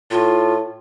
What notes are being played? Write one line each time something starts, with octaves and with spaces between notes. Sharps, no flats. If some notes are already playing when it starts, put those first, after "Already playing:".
A2 F4